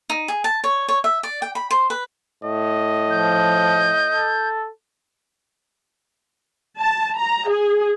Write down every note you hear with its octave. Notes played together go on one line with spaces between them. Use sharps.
D#4
G#4
A5
C#5
C#5
E5
D5
G5
B5
C5
B4
A2 D#5
F3 G6
A4
A5
A#5
G#4